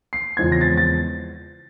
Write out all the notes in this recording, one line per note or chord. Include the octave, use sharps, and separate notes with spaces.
C7
E2 C#3 F3 G#3 C4 G#6
A#6
A6
A6